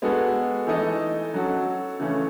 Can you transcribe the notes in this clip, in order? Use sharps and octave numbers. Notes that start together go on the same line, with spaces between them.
G#3 B3 F#4 A4
E3 A3 D#4 A4 D#5
F#3 C#4 F#4 A4
C#3 E3 A3 C#4